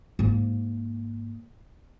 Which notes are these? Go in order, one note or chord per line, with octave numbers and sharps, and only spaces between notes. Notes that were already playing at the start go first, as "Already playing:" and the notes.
G#2 A#3